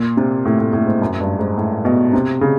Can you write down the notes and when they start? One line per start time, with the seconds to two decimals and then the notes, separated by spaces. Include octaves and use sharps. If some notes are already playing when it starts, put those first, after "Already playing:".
Already playing: A#2
0.17 C3
0.45 A2
0.59 A2
0.73 A2
0.86 G#2
1.02 F#2
1.20 G2
1.39 G#2
1.57 A2
1.85 B2
2.13 C3
2.41 C#3